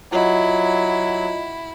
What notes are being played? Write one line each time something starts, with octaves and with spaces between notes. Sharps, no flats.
F#3 E4 F4 D#5